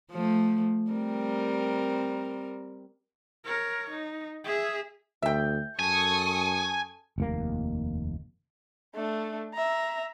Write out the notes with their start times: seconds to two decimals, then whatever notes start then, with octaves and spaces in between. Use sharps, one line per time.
0.11 F3 A3
0.91 G3 C4 A#4
3.45 A#4 C#5
3.90 D#4
4.44 G#4 E5
5.22 D2 E5 G5
5.79 F#2 A4 G#5 C#6 D#6
7.18 F1 D#2 A#3
8.95 A3 D4
9.54 E5 A#5